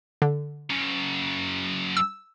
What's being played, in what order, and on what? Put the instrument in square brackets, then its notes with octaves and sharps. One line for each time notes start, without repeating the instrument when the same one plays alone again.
[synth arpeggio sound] D3
[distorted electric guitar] F#2 C#3
[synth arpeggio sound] E6